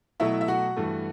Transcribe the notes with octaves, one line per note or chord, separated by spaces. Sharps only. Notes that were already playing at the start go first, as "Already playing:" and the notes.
B2 F#3 A3 E4 E5
E5
F#4 F#5
G2 E3 A3